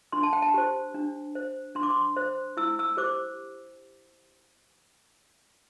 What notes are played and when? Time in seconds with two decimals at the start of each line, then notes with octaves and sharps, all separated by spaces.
0.12 D4 C6
0.23 A5
0.33 G5
0.42 A5
0.54 G4 C5
0.95 D4
1.35 C5
1.75 D4 C6
1.83 D6
1.90 C6
2.16 C5
2.57 E4 E6
2.79 E6
2.97 G4 C5 D6